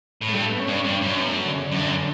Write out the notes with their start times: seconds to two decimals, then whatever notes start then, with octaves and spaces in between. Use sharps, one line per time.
0.22 A2
0.28 A3
0.33 G2 G3
0.42 A3
0.51 B3
0.60 C#4
0.68 G2 D4
0.77 C#4
0.85 G2 D4
0.94 C#4
1.02 F#2 D4
1.12 C#4
1.19 B3
1.28 A3
1.45 D3
1.54 C#3
1.62 D3
1.72 F#2
1.79 G2
1.88 F#2